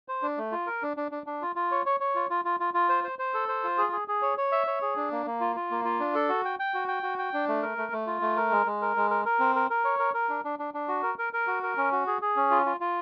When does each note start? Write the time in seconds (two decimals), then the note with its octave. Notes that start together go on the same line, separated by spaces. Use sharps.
0.08 C5
0.22 D4
0.38 A3
0.52 F4
0.67 A#4
0.83 D4
0.97 D4
1.12 D4
1.27 D4
1.42 F4
1.56 F4
1.71 C#5
1.86 C#5
2.00 C#5
2.15 F4
2.30 F4
2.45 F4
2.60 F4
2.74 F4
2.89 C5
3.04 C5
3.19 C5
3.34 A4
3.49 C5
3.64 F4
3.78 G#4
3.92 G#4
4.08 G#4
4.22 C#5
4.38 C#5
4.52 E5
4.67 C#5
4.82 G#4
4.96 D4
5.12 A#3
5.26 A#3
5.41 F4
5.56 F4
5.71 A#3
5.85 F4
6.00 D4
6.15 A4
6.29 F#4
6.45 G5
6.59 G5
6.74 F#4
6.88 G5
7.03 F#4
7.18 G5
7.34 D4
7.48 A3
7.63 A#4
7.78 A3
7.92 A3
8.07 F4
8.22 A3
8.37 A#4
8.51 G#3
8.66 G#3
8.82 A#4
8.96 G#3
9.10 A#4
9.25 A#4
9.40 C4
9.56 A#4
9.70 A#4
9.85 C#5
9.99 A#4
10.14 A#4
10.29 D4
10.44 D4
10.59 D4
10.74 D4
10.88 F#4
11.03 A#4
11.18 A#4
11.33 A#4
11.47 F#4
11.63 A#4
11.77 C#4
11.92 F#4
12.07 G#4
12.22 G#4
12.36 C#4
12.51 F4
12.66 F4
12.80 F4